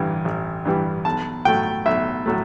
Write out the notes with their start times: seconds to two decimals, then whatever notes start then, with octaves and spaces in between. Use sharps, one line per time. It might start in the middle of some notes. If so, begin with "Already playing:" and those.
Already playing: A1 G2 E3 G3
0.25 A1
0.65 G2 E3 G3
1.05 B1 A5
1.45 A2 F#3 A3 G5
1.86 B1 E5
2.26 A2 F#3 A3